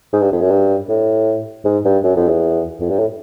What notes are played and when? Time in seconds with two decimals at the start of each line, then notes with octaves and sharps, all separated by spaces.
0.13 G#2
0.22 G2
0.32 F2
0.41 F#2
0.50 G2
0.89 A2
1.65 G#2
1.85 G2
2.03 F#2
2.16 F2
2.29 E2
2.80 F2
2.90 G2
2.99 A2